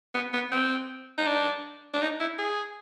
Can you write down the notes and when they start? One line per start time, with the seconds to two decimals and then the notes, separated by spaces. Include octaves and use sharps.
0.15 B3
0.33 B3
0.52 C4
1.18 D#4
1.26 D4
1.94 D4
2.02 D#4
2.20 E4
2.39 G#4